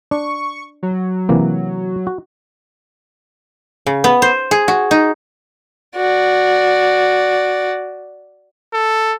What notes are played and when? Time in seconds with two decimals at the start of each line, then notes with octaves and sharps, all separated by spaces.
0.11 D4 C#6
0.83 F#3
1.29 C3 E3 A#3
2.07 F#4
3.86 C#3
4.04 B3
4.22 C5
4.51 G#4
4.68 F#4
4.91 D#4
5.96 F#4 D5
8.74 A4